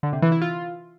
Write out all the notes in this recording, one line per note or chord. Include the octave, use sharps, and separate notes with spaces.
D3
C3
E3
E4
F4